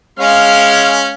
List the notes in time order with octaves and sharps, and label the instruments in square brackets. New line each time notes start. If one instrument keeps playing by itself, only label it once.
[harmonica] G#3 C#4 [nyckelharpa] F5